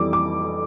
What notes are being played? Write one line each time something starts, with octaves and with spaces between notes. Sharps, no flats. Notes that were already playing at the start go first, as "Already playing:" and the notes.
Already playing: F2 E3 G3 D6
D6